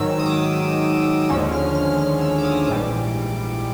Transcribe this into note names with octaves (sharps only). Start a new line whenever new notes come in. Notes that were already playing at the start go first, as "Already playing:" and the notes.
Already playing: G#2 D#3 F#3 E6
D#6
D6
D#2 D3 F3 G#3 C#4 E6
F6
F6
F6
E6
D6
D#6
A#1 G#2 E3 G3 D6